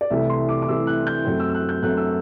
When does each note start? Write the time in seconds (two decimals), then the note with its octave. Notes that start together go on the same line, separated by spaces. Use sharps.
0.01 D5
0.10 C2 C3 E3 A3 E5
0.30 C6
0.49 D6
0.62 D6
0.68 C2 C3 E3 A3 E6
0.87 F#6
1.07 G6
1.25 F#2 F#3 A3 C4
1.40 E6
1.50 E6
1.54 F#6
1.69 G6
1.83 F#2 F#3 A3 C4 F#6
1.97 E6